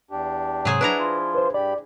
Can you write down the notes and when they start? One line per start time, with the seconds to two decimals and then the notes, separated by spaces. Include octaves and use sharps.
0.11 E2 D4 G4
0.65 G#2 C3 F#3 G#4 C5 D#6
0.81 D4 E4 B4 F#5 A#5
0.99 F3 F4
1.34 B4 C5
1.54 G2 G4 D5 B5